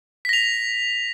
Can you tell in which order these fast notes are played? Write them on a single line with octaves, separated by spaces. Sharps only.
B6 A#6 F7